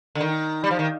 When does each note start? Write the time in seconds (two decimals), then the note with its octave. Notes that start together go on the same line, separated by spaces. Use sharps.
0.15 D3
0.21 D#3
0.64 G3
0.71 F3
0.79 D#3